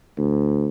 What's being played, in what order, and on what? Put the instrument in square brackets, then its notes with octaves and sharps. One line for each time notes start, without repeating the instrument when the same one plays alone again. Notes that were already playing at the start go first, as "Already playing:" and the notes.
[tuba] D2